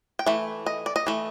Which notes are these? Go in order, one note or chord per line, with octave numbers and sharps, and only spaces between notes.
G5
E3 A3
D#5
D5
D#5
E3 A3